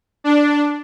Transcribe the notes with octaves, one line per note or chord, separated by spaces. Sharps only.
D4